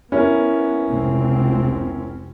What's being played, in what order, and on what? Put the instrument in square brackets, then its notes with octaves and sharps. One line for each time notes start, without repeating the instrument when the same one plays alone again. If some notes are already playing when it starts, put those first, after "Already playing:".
[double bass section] B3 [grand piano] C#4 E4 A#4
[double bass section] F1 C#2 C4